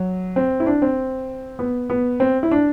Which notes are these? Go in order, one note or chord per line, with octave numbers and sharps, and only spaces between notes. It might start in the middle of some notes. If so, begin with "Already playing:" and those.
Already playing: F#3
C4
E4
D4
C4
B3
B3
C4
E4
D4